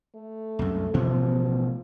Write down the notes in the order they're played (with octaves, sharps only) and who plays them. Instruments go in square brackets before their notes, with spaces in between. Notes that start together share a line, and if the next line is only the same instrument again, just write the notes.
[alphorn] A3
[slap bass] C2 F#2
[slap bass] A1 B2 B3 [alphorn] F3